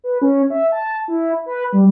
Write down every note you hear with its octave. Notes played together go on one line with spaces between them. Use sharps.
B4
C#4
E5
A5
E4
B4
G3